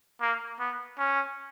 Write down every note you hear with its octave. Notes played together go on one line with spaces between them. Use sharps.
A#3
B3
C#4